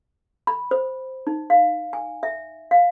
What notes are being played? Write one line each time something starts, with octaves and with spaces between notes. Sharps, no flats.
B5
C5
D#4
F5
G#5
E5
F5